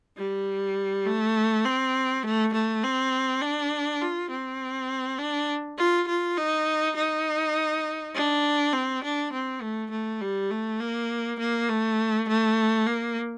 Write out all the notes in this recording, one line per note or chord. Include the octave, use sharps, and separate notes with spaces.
G3
A3
C4
A3
A3
C4
D4
F4
C4
D4
F4
F4
D#4
D#4
D4
C4
D4
C4
A3
A3
G3
A3
A#3
A#3
A3
A3
A#3